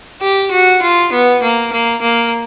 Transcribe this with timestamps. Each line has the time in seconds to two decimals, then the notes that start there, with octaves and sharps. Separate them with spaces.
0.22 G4
0.51 F#4
0.82 F4
1.13 B3
1.43 A#3
1.73 A#3
2.02 A#3